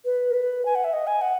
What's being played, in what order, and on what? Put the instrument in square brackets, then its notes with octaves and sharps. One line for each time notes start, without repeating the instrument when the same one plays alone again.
[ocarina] B4
A#4
B4
G#5
F#5
E5
D#5
G#5
F#5